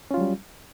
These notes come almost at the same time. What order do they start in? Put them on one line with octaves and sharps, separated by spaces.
C#4 F4 F#3 G3